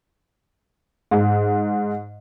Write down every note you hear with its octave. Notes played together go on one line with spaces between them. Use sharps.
G#2